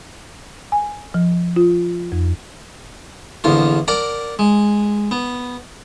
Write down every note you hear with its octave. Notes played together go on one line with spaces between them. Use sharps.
G#5
F3
F4
F2
A#1 E2 D3 F4
A#4 D5 F#5 A5
G#3
B3